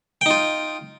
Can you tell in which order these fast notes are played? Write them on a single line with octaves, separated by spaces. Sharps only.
G5 D#4 F4